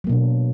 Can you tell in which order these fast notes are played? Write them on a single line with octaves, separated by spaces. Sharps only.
F#3 A#3 B2 D4